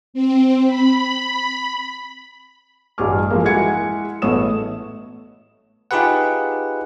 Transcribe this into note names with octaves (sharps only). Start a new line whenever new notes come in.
C4
B5
A1 G2 G#4 D6 F6
F3 G#3 A#3
G#3 E4 F#4 F#5 G#6 C#7
A1 A3 B3 C#5 D#6 E7
D#4 F4 G4 G#4 B4 F#5